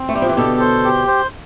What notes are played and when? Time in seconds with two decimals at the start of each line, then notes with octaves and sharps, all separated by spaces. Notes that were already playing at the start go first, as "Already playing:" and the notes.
Already playing: C4
0.09 A3
0.14 G3 G4
0.22 F3
0.29 E3
0.37 B2 D3 A4
0.60 C5
0.84 G4
1.07 C5